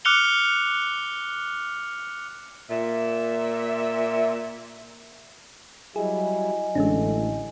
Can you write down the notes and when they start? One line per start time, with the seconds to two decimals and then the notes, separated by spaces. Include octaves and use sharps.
0.05 D6 F6 F#6 C#7 F7 G7
2.70 A#2 E5
5.96 F#3 G3 E4 G#4 D#5 G#5
6.75 A1 D3 G#3 A3 C#4 D4